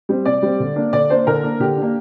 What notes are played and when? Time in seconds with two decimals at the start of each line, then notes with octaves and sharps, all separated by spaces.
0.09 G3 C4
0.25 C3 D5
0.42 G3 C4
0.60 D3
0.76 A#3 D4
0.93 D3 D5
1.10 A#3 D4 C5
1.27 D3 A#4
1.44 A#3 D4
1.60 D3 G4
1.77 D4
1.82 A#3